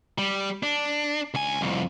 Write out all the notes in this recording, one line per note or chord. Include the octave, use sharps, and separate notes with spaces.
G3
D4
C#2 G#5
C2 F2